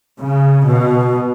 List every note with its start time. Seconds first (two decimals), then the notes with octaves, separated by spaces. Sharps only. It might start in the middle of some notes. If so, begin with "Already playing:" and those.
0.20 C#3
0.67 B2